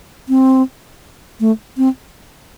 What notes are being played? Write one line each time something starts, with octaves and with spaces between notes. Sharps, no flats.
C4
A3
C4